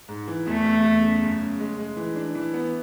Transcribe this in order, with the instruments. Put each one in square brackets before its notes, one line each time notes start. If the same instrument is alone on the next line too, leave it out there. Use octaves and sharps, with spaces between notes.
[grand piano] G#2
E3
[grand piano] E2 [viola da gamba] A3
[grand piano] E2
E2
C#3
F#2
C#3
G#3
G#3
E3
D4
E3
B3